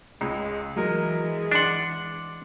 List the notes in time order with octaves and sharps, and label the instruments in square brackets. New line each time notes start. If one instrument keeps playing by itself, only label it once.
[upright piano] C#2 [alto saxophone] G#3
[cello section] E3 [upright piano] F#3 A#4 [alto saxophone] G#3
[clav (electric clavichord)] D4 F#5 [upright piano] C6 D6